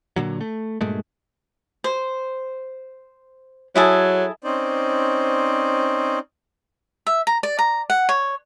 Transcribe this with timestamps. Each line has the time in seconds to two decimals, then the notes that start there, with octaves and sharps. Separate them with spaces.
0.16 A#2 D3 F#3
0.41 A3
0.81 G2 A#2 G#3 A3
1.84 C5
3.76 F#3 E4 G#4 A4
4.43 C4 C#4 D#4 C5 D5
7.07 E5
7.27 A#5
7.43 D5
7.59 A#5
7.90 F#5
8.09 C#5